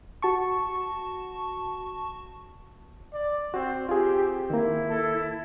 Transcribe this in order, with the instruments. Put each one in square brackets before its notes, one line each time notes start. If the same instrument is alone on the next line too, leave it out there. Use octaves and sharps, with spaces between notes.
[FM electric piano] F#4 A5 C#6
[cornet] D5
[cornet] C4 [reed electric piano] F#4
[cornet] C4 [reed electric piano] F4 G#4 [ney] G4
[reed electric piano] D#3 A#3 [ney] E4
[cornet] A4